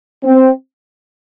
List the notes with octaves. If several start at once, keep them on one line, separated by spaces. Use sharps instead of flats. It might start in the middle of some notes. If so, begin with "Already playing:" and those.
C4